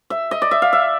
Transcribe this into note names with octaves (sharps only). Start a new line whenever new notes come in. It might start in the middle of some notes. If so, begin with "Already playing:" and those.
E5
D#5
D5
E5
F5
E5